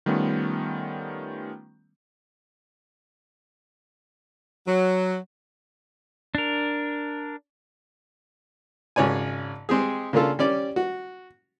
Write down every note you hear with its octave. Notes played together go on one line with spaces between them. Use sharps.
D#3 G3 A3 B3 C#4 F4
F#3
D4 A#4
G#1 C#3 C#5 D5 G#5
G#3 C4 G4 G#4
C#3 A#3 D4 F4 A4
G3 C#4 D5
F#4